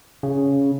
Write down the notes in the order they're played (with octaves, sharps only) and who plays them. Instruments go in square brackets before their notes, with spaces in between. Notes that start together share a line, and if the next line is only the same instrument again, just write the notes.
[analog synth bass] C#3